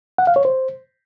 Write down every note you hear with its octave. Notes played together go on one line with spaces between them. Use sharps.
F#5
F5
C#5
C5